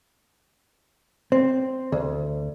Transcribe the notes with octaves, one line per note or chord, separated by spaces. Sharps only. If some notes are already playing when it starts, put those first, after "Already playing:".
C4
D2